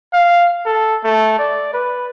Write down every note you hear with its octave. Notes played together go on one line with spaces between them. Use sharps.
F5
A4
A3
D5
B4